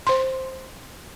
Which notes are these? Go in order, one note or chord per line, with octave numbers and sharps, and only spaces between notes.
C5 C6